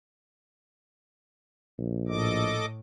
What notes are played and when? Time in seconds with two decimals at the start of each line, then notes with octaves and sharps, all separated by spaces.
1.79 A#1
2.08 A2 A4 D#5 D6